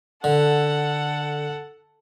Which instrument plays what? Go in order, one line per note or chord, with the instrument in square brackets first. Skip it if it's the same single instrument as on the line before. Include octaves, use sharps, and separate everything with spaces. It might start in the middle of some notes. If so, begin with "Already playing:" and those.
[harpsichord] D3 [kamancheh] A4 F#5